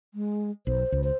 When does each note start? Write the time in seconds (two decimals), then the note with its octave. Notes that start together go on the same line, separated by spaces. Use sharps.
0.14 G#3
0.67 B1 C5
0.92 C#2
1.04 C5